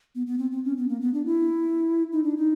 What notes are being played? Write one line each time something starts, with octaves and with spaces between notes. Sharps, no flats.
B3
B3
C4
C4
C#4
B3
A#3
B3
D4
E4
D#4
D4
D#4